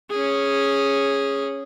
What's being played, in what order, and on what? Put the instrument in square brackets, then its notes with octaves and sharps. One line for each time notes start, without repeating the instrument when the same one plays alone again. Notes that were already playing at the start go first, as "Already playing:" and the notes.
[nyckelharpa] C#4 G#4